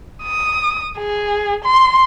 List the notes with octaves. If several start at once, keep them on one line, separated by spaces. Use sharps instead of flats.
D#6
G#4
C6